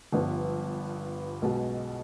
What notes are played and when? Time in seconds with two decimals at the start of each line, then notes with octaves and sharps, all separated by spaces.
0.12 G1 G2 F3 B3
1.42 B1 B2 G#3